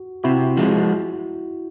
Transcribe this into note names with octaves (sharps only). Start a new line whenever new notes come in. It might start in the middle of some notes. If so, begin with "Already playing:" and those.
Already playing: F#4
C3 E4 F#4
F3 G#3